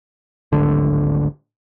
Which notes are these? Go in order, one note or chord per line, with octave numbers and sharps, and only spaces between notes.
D1 G#1 D3